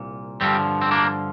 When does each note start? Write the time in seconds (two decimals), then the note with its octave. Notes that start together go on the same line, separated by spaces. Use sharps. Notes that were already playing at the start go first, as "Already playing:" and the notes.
Already playing: C2 A#2
0.41 G2 D3 F3 G3 C4
0.81 C4
0.91 A#3 D4